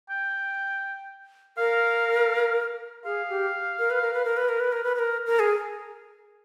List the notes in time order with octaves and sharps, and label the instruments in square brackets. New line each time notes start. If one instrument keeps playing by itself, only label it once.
[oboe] G5
[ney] A#4 [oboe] F5
[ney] G#4 [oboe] F5
[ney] G4
A#4
B4
A#4
B4
A#4
B4
A#4
B4
A#4
B4
B4
A#4
A#4
G#4